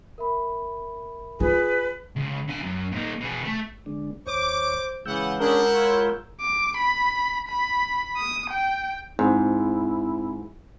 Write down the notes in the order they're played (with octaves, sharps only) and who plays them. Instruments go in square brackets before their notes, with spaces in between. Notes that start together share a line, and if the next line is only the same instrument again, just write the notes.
[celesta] A#4 E5 B5
[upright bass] F4 [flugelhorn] G#4 [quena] B4
[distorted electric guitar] C#2
D3 G#5
F#2
A#2 D#4
B2 G#4
A3
[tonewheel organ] D3 G#3 D4
[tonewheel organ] D#2 C#5 [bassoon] C5 [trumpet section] D6
[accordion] C#3 E3 [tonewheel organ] G#3 E6 G6 [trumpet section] B3 F#5
[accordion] C#4 D4 G#4 [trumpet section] E4 F#5 [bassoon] A#4
[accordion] F4 C#5
[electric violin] D6
B5
B5
D#6
G5
[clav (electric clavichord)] G#2 [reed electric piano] C4 [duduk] E4